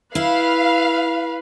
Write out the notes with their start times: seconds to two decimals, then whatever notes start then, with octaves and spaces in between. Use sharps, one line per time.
0.15 E4 B4 F5